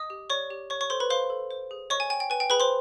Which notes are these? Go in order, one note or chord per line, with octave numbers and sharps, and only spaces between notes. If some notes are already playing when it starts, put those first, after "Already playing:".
Already playing: D#5 D#6
G4
C#5 D5 C#6
G4
C#5 C#6
C#5 C#6
A4 C5 C6
B4 B5
C5 F5 C6
A4
C5
G#4
C#5 D#5 C#6
G#5
G5 G#5
G5
B4 G#5
G5
G#4 B4 B5
C5 C6